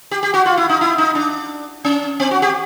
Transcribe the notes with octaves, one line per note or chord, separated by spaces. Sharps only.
G4
G4
F#4
F4
E4
D#4
E4
D#4
D4
C#4
C4
F#4
G4